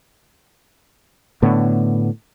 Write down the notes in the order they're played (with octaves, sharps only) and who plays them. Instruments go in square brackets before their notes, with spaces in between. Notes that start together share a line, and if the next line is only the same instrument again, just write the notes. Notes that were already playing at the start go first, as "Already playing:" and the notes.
[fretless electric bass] A2 D3 B3